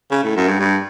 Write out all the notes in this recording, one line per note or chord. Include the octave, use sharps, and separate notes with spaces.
C#3
A2
F#2
G2
G2